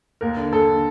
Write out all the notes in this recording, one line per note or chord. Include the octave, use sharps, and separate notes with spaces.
D#2 A#4
D3
D#2 A4
D3